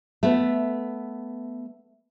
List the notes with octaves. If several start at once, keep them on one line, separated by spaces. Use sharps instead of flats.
A3 B3